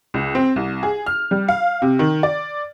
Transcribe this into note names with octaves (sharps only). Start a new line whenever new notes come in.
C#2
C4
C2
G#4
F6
G3
F5
C3
D#3
D5